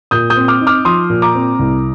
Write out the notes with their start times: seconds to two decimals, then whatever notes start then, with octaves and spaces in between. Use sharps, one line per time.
0.11 A#2 D#6 G6
0.30 D#6 G6
0.36 C4
0.48 D6 F6
0.61 D#4
0.67 D6 F6
0.85 F3 C6 D#6
1.10 A#2
1.22 A#5 D6
1.35 C4
1.59 C2